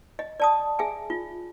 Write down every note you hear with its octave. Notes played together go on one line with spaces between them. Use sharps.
D#5
D5 A5 D#6
G#4 E5 G#5
F4